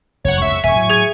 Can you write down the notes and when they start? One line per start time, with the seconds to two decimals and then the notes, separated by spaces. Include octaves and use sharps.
0.25 F#1 F2 C#5 F#5
0.38 F1 C#2 A#2 E5 C#6
0.49 F2 C3
0.64 D#1 E5 G#5 C#6
0.76 A2 F#3
0.90 G#4 G#6